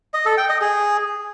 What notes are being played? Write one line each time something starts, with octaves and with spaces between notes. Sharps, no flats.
D#5
A4
G5
D#5
G#4